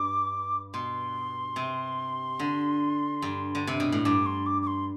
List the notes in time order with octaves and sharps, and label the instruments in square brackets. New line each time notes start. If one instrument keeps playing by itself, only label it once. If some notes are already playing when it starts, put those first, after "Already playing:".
Already playing: [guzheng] G2 [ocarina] D6
[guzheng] B2 [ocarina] C6
[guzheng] C3
D3
G2
D3
C3
B2
A2
[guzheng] G2 [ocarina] D6
[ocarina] C6
D6
D6
C6